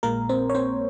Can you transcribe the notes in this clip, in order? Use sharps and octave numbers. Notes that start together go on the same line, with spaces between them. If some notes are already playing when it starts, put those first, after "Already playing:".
A#1 A#2 G#3 A#3 A#4
C4 C5
C#5
C4 C5